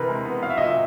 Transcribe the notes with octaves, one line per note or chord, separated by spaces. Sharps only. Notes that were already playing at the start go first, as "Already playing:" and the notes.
Already playing: C3 E3 A#4 B4
G#3
B3
F#3 F5
E5
D#5
A#2 E5